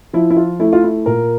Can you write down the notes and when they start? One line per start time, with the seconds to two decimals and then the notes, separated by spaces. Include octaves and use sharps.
0.13 F3 E4
0.30 E4
0.36 F4
0.60 A3 E4
0.73 F4
0.84 E4
1.06 A#2 A#4